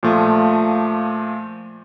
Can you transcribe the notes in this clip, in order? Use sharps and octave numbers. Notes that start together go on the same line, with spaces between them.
A#2 F3 A3